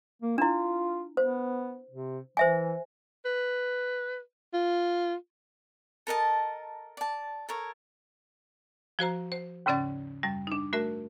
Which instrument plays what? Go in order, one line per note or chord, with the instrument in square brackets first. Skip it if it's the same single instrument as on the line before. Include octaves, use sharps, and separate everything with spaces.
[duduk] A#3
[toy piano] D4 E4 [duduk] F4
[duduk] B3 [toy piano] C5
[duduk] C3
[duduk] E3 [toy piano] C5 E5 G#5
[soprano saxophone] B4
F4
[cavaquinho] A4 A#4 D#5 A5
D5 A5
A4 A#4 C#5
[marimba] F3 F#4 C5 A#5
C5
D#2 G#2 C#3 C#4 D5 A6
F#2 G3
D4 D#4
A3 F#4 A#4 E5